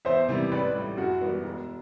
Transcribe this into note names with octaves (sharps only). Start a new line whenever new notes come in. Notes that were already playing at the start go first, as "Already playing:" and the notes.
E2 C5 E5
C3 E3 G3
A1 B4 D5
A2 G3
F#2 F#4
E3 G3 B3
E1